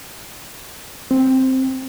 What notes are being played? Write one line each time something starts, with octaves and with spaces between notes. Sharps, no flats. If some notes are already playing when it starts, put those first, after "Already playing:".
C4